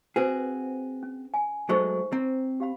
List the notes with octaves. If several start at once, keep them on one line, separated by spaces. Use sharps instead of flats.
C4 F#4 G#4 B4 C5
C#4
G#5
F#3 G#3 A3 D#4 C5 C#6
C4 A#5
G4 F5 B5